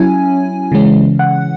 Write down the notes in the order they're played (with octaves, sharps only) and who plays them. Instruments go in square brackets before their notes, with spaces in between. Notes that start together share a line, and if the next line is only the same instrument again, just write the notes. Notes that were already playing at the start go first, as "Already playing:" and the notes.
Already playing: [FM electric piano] F#3 C#4 E4 G#5
C#3 E3 G#3 C#4
F#5